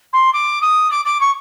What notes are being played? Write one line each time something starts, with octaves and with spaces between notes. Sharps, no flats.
C6
D6
D#6
D6
D6
C#6